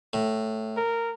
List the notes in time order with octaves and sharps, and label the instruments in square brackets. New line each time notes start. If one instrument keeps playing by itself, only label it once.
[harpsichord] A2
[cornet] A#4